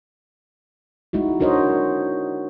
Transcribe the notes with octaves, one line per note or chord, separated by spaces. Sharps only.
G#3 D#4 E4 F#4
D4 F#4 A#4 C5 C#5 D#5